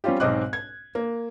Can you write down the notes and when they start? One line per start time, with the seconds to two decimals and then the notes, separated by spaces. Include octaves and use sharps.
0.04 G3 C4 C#4 F4 G4
0.20 B1 G#2 C4 D#5 D6 F#6
0.53 G#6
0.95 A#3